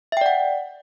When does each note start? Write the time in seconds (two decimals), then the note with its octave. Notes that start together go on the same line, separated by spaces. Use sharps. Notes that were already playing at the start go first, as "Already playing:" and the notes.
0.12 E5
0.17 G5
0.21 D5
0.26 F#5